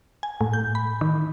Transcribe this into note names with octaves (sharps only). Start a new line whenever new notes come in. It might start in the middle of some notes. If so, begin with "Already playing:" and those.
G#5
A2
G6
B5
D#3